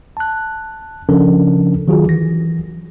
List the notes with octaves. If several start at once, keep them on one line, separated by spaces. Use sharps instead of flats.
A5 F#6
C#3 F3 C#4 D4 A4 A#4
D#3 F#3 F4 F#4 G#4
E3 A#6